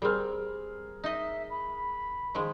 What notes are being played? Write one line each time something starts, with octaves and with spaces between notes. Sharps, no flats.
G3 C4 G#4 A#4 F6
D#4 D#5 E5
B5
D#3 F3 G#3